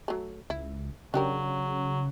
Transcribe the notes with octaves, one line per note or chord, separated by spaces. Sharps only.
F#3 A3
C#2 E4
C#3 F#3 D4 G4 A#4